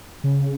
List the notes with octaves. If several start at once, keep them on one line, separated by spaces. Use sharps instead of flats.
C#3